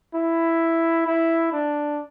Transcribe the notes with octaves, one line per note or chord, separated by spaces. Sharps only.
E4
E4
D4